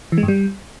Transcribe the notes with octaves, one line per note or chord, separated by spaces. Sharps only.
E3
G#3
G2
G3